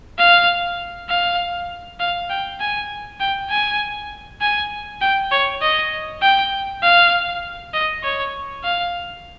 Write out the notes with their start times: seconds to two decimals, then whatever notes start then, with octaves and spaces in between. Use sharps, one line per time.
0.18 F5
1.09 F5
2.00 F5
2.30 G5
2.60 G#5
3.20 G5
3.50 G#5
4.41 G#5
5.01 G5
5.31 C#5
5.62 D#5
6.22 G5
6.83 F5
7.73 D#5
8.03 C#5
8.64 F5